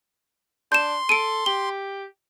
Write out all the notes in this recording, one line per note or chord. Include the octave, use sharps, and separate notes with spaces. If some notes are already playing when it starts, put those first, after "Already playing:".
D4 C6 G6 E7
A4 D7 D#7
G4 G7